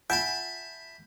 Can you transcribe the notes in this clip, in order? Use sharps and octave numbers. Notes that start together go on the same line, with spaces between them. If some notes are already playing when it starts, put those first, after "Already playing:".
F4 E5 F#5 G#5 A5 B5 G6